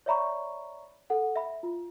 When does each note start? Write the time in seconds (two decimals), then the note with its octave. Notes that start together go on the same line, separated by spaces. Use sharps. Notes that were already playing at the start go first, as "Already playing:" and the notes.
0.06 C#5 D5 E5 A#5 B5 C#6
1.10 A4 F#5
1.36 E5 B5
1.63 F4